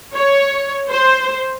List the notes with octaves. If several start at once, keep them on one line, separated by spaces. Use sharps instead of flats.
C#5
C5